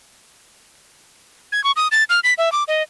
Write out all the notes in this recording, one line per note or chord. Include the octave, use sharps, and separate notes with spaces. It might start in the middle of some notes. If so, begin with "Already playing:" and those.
G#6
C#6
D#6
A6
F6
B6
E5
D6
D#5